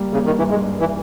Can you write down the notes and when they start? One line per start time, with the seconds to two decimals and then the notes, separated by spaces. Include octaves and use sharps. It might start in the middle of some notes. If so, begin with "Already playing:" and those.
Already playing: G3 A#3
0.13 C#3 A#3
0.26 D#3
0.38 G2 E3
0.50 G#3
0.63 G2
0.80 E3